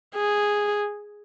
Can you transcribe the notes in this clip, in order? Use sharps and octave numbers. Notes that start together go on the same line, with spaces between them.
G#4